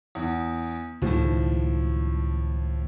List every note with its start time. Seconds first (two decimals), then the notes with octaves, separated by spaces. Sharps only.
0.15 E2
1.02 C#2 A2 D#3 F3